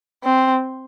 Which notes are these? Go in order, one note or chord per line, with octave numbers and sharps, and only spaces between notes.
C4